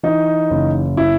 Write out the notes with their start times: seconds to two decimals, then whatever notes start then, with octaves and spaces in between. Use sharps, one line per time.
0.03 E3 D#4
0.51 F#1
0.97 E4